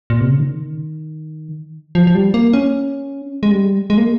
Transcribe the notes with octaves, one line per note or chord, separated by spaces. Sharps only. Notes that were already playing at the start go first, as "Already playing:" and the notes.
A#2
C3
C#3
D#3
F3
F3
G3
A#3
C#4
G#3
G3
G#3
A#3